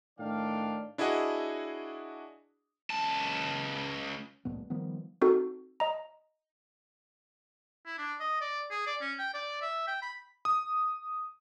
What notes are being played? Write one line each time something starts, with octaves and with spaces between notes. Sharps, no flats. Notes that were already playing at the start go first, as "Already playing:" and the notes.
A2 D#3 D4 D5 F5 G5
D4 E4 F#4 G#4 D#5 F#5
C#2 A5
D#1 C2 A2 B3
D#3 F3 G3 B3
C4 D#4 F#4 A4
D#5 A#5
E4
D4
D#5
D5
G#4
D5
C#4
G5
D5
E5
G5
B5
D#6